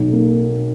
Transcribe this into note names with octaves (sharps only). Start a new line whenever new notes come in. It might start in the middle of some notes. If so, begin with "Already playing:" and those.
Already playing: B1
A#3